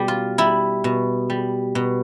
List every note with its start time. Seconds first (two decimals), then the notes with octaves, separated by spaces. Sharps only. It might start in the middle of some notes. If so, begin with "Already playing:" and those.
Already playing: B2 G3 G4
0.08 F4
0.38 G3 E4
0.84 B2
1.30 G3
1.75 B2